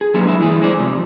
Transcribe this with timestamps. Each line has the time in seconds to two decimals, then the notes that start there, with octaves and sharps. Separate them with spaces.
0.01 G#4
0.14 F#3 G3 A#3 B3 D4
0.27 G#3 E4
0.39 G2 E3 G#4
0.62 G#3 C5 D5
0.79 C3 F3 G3